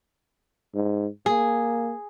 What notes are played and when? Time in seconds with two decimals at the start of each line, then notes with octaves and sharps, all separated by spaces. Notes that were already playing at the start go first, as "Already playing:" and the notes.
0.74 G#2
1.26 A#3 G#4